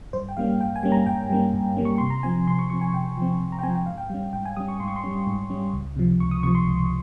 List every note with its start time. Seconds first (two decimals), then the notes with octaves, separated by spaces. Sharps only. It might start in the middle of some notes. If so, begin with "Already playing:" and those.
0.13 G2 C5
0.29 G5
0.37 G3 A#3 C#4 F5
0.60 G2 G5
0.76 G#5
0.83 G3 A#3 C#4
0.92 A#5
1.06 G2 G5
1.30 G3 A#3 C#4
1.54 G2
1.77 G3 A#3 C#4
1.85 C#6
1.98 C3 C6
2.10 A#5
2.23 F3 C4 G#5
2.47 C3 C6
2.59 C#6
2.70 F3 C4 C#6
2.81 G#5
2.93 C3 G5
3.17 F3 C4
3.40 C3
3.52 A#5
3.59 G5
3.63 F3 C4 G#5
3.75 G5
3.86 G#2 F5
3.98 G5
4.10 G3 C#4
4.33 G#2 G5
4.45 G#5
4.57 G3 C#4 D#6
4.68 C#6
4.80 G#2 C6
4.88 C#6
4.96 C6
5.04 G3 C#4
5.27 G#2
5.50 G3 C#4
5.73 C#2
5.96 C3 F3
6.20 C#2 C#6
6.31 D#6
6.43 C3 F3 C#6
6.55 C6
6.67 C#2